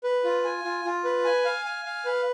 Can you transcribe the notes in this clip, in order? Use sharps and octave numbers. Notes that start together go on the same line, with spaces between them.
B4
F4
G#5
F4
F4
B4
G#5
F5
G#5
F5
B4